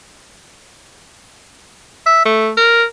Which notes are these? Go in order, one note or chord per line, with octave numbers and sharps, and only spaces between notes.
E5
A3
A#4